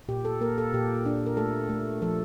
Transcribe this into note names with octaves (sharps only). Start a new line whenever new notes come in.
A#2 G4
A4
A#3 A#4
A4
A#2 G4
D4
A#4
A3 A4
A3
F3 A4